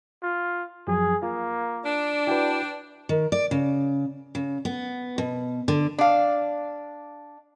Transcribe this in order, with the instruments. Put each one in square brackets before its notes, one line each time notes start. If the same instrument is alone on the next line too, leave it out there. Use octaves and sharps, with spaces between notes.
[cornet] F4
[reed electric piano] F#2 F3 F#3 [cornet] G#4
[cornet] A#3 [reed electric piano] F4
[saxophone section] D4
[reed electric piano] E4 F#4 B4 [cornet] G5
[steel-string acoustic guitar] D#3
D5
C#3
C#3
B3
B2
D3
[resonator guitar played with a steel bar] D4 F5